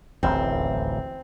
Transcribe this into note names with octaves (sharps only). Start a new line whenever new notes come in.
D1 A1 D#2 C4